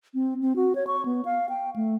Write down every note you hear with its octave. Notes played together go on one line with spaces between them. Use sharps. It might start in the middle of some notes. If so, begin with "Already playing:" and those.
C4
C4
F#4
C#5
C#6
B3
F5
G5
A3